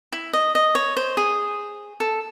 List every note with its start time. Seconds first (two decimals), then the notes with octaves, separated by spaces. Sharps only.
0.12 E4
0.33 D#5
0.55 D#5
0.75 C#5
0.97 C5
1.17 G#4
2.00 A4